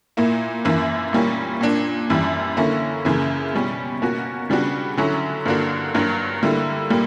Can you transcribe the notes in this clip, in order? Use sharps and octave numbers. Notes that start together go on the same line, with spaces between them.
A#2 A#3 E4
F#2 E3 A#3
A#2 G3 A#3 C#4
A#2 A#3 D4
F#2 E3 G3
D3 A#3 C#4 E4
F#2 C#3 E3 A#3
B2 G3 C#4
B2 A#3 C#4 F#4
C#3 G3 B3 D4 F#4
D3 F#3 C#4 E4
G2 D3 A#3 D4 F#4
G2 F#3 A#3
D3 G3 A#3 E4
A#2 G3 A#3